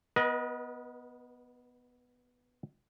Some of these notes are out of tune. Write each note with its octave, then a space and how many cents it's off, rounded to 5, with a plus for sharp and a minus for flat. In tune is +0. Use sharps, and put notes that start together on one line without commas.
B3 +0 B4 -40 D#5 +10